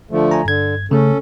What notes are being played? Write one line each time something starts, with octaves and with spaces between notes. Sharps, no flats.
D3 F3 A3
G#5 A#5
G2 D3 G#6
C#3 A3 C#4 A4